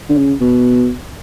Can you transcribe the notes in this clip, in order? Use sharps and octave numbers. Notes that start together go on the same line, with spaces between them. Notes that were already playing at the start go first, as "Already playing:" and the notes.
D3
C#3
B2